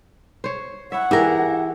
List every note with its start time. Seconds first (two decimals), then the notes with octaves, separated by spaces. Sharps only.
0.44 C5 C#5
0.92 E4 C#5 E5 F#5
1.11 E3 E4 G4 G#4 A#4